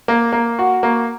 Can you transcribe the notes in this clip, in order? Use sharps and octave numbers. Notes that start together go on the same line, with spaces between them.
A#3
A#3
F#4
A#3